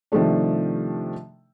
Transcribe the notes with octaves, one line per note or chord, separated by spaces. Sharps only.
C3 D#3 F3 G3 A3 D4